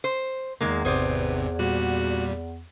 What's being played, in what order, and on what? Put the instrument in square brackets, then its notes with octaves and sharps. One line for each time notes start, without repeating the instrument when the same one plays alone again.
[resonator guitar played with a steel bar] C5
[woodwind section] E2 [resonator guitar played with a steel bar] D#3 G#3 A#3
[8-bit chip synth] G#1 C3 [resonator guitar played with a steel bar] G#4 C5 D5 [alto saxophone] B4
[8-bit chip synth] A#2 G3 [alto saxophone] F#4